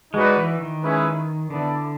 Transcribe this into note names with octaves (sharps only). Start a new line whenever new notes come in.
G#3 D#4 F#4 B4 D5
E3
D#3
G#3 C#4 E4 G#4 B4
D3 B3 E4 A4 D5